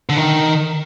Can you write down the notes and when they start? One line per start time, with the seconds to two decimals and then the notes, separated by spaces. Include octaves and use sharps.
0.09 D3
0.17 D#3